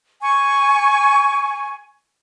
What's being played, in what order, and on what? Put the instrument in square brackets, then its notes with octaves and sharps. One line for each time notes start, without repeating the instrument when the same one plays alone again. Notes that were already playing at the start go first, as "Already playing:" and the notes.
[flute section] G#5 C#6